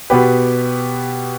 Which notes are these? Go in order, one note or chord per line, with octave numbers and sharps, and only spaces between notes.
B2 B3 G4 B4